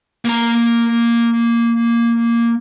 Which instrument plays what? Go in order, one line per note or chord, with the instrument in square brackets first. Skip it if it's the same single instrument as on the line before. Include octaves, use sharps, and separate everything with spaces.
[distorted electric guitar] A#3 A#5